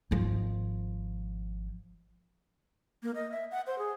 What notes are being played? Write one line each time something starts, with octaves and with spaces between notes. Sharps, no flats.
G#1 F3
A#3
D#5
E5
F#5
C5
G#4